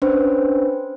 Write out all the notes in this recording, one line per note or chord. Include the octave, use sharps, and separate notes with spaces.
C#4 D4 B4 C5